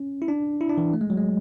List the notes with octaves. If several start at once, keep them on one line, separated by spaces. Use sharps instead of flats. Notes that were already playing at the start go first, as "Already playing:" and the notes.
Already playing: C#4
E4
D4
E4
D4
E3
A3
G#3
F#3
G#3